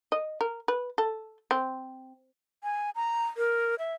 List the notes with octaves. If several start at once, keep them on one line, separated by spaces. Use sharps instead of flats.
D#5
A#4
B4
A4
C4
G#5
A#5
A#4
E5